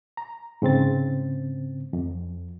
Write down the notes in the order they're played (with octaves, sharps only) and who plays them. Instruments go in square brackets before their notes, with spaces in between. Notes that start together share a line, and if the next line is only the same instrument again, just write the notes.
[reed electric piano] A#5
G#2 C#3 C4 A6
F2